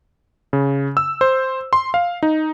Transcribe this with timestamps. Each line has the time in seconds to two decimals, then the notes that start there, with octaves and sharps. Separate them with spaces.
0.53 C#3
0.97 E6
1.21 C5
1.73 C6
1.94 F5
2.23 D#4